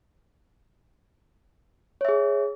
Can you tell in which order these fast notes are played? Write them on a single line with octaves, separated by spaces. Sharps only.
C#5 E5 G#4